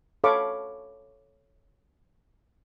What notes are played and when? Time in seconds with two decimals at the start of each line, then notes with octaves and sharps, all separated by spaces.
0.24 A4 C#5 F5 B5 C#6 D6